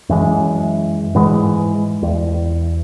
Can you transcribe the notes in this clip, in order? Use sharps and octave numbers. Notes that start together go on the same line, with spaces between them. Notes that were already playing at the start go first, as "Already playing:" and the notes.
F#2 E3 G#3
G#2 E3 G#3
E2